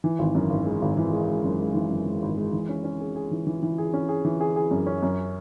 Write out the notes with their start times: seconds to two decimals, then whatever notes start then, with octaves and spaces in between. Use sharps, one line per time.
0.04 E3
0.19 G#1
0.35 F#2
0.50 G#1
0.66 G#3
0.82 G#1
0.97 E3
1.13 G#3
1.28 G#3
1.44 F#2
1.60 G#3
1.75 E3
1.90 F#2
2.06 G#3
2.22 G#1
2.37 G#3
2.53 E3
2.69 C#4
2.84 C#4
3.00 G#4
3.16 G#4
3.31 E3
3.47 E3
3.63 E3
3.78 G#4
3.94 C#4
4.09 G#4
4.25 E3
4.40 G#4
4.56 G#4
4.71 F#2
4.86 C#4
5.02 F#2